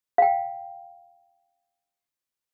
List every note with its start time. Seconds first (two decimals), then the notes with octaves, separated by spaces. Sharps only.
0.18 F5 G5